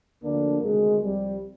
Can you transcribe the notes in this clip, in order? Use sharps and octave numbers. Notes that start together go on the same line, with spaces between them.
D2 D3 F3 A#3 D4
D2 C3 D#3 G#3
C2 C3 F3 G3